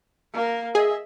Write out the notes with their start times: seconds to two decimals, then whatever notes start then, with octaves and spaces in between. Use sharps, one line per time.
0.33 A#3 A#4
0.75 G#4 D#5 E5